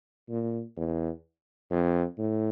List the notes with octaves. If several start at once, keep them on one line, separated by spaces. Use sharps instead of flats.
A#2
E2
F2
A2